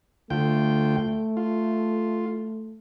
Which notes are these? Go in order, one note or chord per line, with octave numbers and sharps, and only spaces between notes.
D2 A3 F4 G5
F4